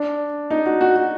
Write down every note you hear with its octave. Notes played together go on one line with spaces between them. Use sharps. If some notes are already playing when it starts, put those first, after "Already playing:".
Already playing: D4
D#4
F#4
F#4
F#4